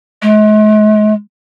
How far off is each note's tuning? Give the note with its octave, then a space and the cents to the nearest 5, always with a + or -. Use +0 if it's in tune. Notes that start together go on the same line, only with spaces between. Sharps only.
G#3 +45